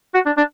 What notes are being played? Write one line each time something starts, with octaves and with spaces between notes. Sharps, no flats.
F#4
D4
D4